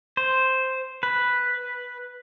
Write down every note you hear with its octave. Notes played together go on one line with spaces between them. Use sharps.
C5
B4